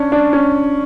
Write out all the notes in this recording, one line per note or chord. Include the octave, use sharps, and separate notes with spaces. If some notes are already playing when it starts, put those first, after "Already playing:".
Already playing: C#4 D4
D4
C#4